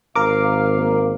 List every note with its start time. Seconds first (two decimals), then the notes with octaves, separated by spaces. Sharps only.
0.15 G#1 A#4 F5 D6
0.77 A#3